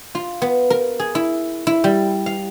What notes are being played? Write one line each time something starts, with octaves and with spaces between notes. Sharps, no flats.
F4
B3
A#4
G#4
E4
E4
G3
F5